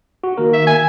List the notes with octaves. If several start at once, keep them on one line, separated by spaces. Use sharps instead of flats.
F#4
D#3 A#3 A#4
E5
G#5